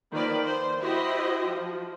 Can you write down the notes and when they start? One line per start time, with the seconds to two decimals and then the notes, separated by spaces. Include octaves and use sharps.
0.12 D#3 F3 A#3 B4 D5
0.43 C5
0.79 E4 F#4 G4 C5 D#5
1.46 F3